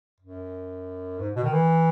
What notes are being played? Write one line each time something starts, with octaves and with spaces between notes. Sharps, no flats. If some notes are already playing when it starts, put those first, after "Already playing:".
F#2
G#2
B2
D#3
E3